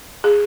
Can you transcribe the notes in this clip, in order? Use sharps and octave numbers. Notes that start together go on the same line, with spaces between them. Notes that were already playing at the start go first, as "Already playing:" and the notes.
G#4